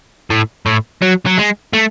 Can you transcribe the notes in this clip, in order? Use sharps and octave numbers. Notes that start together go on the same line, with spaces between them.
A2
A2
F#3
F#3
G#3
A3